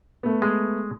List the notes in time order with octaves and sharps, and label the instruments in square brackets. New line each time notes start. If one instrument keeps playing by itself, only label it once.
[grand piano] A3 B3
[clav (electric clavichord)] G#3